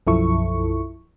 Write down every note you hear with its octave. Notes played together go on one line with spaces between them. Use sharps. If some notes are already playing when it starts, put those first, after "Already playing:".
B1 F#2 F3 E4 A4 C#6